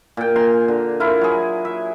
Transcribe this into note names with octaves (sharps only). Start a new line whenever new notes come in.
A#2 G5
G#5 A#5 C6
D3
E4 F4 A#4
F#3 G#4
E5